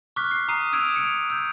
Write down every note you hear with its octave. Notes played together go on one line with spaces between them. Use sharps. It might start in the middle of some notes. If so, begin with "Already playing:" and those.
C#6 D6 F6 F#6 B6
C7
A#5 D#6 C7 D#7
D#6 E6 G#6 D7 E7 F7
C#7 D7 F7
E6 G6